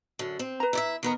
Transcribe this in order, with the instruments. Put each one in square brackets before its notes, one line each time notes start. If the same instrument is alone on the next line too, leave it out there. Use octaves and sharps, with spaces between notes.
[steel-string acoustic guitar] F#2 D3
C4
[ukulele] B4 A#5
[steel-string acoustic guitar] E4 D5 E5
D#3 B3 A#4